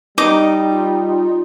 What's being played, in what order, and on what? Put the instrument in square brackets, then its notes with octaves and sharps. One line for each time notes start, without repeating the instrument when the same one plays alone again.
[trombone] G3 [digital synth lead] D#4 [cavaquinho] D#5 D6
[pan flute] F4